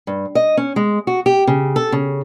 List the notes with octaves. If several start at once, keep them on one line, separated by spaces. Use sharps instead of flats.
G2
D#5
C#4
G#3
F#4
G4
C#3
A4
C#3